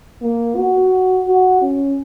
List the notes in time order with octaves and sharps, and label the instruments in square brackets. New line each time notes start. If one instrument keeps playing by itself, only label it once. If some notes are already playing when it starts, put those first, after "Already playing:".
[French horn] A#3
F#4
F#4
C#4